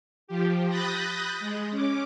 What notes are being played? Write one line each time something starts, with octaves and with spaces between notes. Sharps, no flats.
F3 G4
B5 D#6 F#6 G6 A6 A#6
G#3
C#4 D6